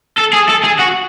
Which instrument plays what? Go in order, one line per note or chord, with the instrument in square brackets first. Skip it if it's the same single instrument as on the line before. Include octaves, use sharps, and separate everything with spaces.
[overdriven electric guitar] A4
G#4
A4
G#4
F#4